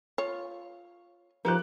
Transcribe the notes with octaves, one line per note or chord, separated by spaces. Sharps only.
F4 C#5
F3 D#4 G4 A#4 F#6